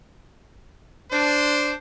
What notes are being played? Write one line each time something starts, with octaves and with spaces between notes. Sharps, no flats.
D4 C5